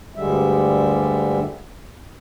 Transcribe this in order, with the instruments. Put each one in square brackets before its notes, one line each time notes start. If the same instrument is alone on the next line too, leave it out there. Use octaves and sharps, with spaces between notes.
[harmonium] D2 G2 D3 G3 G#3 E5